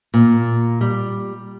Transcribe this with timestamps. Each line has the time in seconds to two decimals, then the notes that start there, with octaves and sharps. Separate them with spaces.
0.14 A#2
0.81 G3